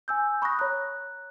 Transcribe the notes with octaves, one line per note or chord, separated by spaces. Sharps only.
G#5 E6 G6
B5 C#6 D#6 F#6 A#6
C#5 A#5 F#6